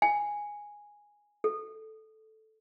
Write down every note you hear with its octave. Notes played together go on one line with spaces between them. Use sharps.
G#5
A4